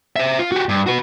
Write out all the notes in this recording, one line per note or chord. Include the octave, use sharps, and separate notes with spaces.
C5 E5
F4
F#4 G4
G2
F#4 B4